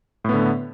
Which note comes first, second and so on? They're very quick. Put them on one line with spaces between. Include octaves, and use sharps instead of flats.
A2 B3 D3